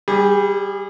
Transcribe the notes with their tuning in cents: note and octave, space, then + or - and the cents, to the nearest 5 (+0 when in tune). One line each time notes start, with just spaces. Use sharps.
G3 +0 G#4 -30